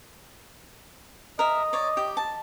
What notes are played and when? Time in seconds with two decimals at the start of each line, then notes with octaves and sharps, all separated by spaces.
1.39 A#4 D#5 E5
1.73 C#5 D5
1.97 G4
2.17 A5